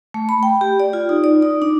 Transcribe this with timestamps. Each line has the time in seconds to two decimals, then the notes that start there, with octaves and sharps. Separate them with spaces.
0.14 A3
0.29 B5
0.43 G5
0.61 G4
0.80 D5
0.93 F4
1.09 D#4
1.24 D5
1.42 D#4
1.62 D4